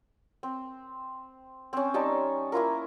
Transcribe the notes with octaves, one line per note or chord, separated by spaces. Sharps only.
C4
C4 C#4
G3 D#4 C#5 A5
A#3 E4 F4 A#4